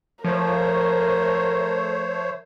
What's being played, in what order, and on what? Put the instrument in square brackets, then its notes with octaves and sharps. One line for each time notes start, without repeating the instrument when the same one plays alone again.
[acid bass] F3 [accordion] A3 C5 C#5 [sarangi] A#4